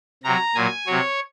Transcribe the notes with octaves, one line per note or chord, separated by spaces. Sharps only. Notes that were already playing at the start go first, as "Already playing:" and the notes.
C3 F#3 A#5
A#2 F#3 G#5
C3 F#3 C#5